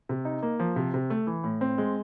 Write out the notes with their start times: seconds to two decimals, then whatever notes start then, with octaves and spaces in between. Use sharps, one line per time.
0.09 C3
0.25 D#4
0.42 A#3
0.60 F3
0.76 C3
0.94 C3
1.10 A3
1.27 E3
1.44 A2
1.61 C4
1.78 G#3